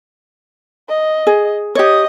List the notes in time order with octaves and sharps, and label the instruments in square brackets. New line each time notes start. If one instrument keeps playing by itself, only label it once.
[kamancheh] D#5
[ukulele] G#4
[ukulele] G4 C#5 [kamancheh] D#5 D#6